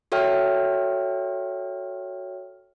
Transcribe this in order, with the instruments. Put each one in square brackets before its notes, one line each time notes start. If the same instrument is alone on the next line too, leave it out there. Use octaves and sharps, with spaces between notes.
[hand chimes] F#4 A4 C#5 E5 G5 F6